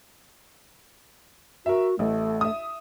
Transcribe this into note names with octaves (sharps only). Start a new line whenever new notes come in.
F#4 A#4 E5
A1 A3
E5 D#6